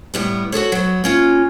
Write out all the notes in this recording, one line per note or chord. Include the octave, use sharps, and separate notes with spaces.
A2 G3 B3
F#4 G#4 A4 C#5
F#3 B3
A#3 C#4 F4